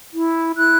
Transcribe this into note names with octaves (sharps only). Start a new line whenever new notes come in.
E4
E4 F#6